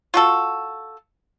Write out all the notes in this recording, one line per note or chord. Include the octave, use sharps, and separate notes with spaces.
F4 F#4 A4